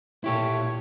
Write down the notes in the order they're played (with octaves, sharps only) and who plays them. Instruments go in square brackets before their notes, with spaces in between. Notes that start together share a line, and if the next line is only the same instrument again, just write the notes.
[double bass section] A#2 [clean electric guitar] E4 G4 A4 [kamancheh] C#5